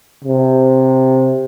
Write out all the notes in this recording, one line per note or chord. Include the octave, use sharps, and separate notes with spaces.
C3